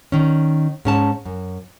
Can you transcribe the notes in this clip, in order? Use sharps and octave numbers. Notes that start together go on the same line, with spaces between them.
D#3 C#4
G#2 C#4 A5
F#2